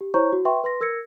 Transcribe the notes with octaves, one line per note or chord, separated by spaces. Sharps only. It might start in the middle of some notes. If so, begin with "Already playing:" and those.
G4
E4 C5 C#5 A#5 C#6 G6
F#4
B4 E5 G5 C6 C#6
B4 C6 A#6
A#4 E6 G#6 A#6 C#7